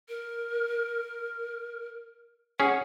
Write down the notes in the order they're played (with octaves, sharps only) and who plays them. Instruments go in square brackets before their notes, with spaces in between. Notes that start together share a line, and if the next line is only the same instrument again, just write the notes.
[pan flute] A#4
[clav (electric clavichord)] C#4 G#4 [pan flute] F#5